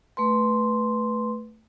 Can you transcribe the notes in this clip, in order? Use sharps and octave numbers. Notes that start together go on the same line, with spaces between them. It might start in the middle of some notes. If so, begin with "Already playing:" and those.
A3 B4 C6